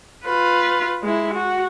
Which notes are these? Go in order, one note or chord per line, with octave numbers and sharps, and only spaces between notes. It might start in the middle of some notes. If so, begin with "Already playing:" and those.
F4 B4
G#3 E4
F#4